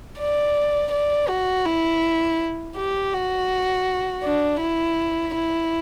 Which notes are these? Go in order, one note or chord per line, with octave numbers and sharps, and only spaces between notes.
D5
D5
F#4
E4
G4
F#4
D4
E4
E4